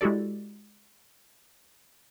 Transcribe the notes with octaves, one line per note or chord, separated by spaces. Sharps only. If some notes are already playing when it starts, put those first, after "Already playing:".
G#3 E4 F#4 G4 A4 D5